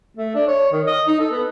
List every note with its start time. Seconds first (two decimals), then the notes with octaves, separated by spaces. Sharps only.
0.17 A3
0.35 D4
0.48 C#5
0.72 D#3
0.86 D#5
1.07 D#4
1.20 A4
1.31 B3